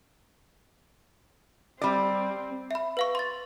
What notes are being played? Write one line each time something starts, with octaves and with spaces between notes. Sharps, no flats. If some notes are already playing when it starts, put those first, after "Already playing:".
G3 C4 D5
E5 B5
B4 F5 C#6
C6 A6